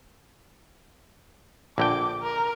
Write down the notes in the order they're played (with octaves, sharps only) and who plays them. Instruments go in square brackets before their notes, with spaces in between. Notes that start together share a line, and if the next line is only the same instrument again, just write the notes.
[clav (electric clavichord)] A#1 D3 G5 [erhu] D6
[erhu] A#4